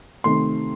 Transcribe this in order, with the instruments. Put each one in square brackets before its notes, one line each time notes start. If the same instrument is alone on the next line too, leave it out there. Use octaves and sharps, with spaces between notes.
[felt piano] C3 D#3 A3 C6